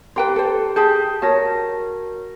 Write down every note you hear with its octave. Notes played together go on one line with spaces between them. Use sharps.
G4 B4 G5 A#5 C6
A4 C5
G4 G#4 A5 G6
F#4 A#4 C#5 A5 A#6